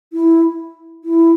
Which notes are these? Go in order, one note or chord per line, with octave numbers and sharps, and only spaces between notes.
E4
E4